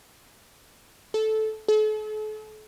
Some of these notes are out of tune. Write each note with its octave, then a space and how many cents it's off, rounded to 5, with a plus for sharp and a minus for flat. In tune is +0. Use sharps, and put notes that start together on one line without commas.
A4 -10
A4 -40